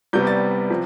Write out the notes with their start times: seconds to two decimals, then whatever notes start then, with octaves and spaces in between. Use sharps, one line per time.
0.13 C2 C3 G3 B3 G6
0.27 A6
0.70 C3 F3